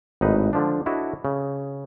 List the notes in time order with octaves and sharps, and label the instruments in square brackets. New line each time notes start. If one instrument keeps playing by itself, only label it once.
[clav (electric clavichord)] G#1 A2 D#4 B4
D3 F3 D4
D4 E4 F#4 A4 C#5 D#5
C#3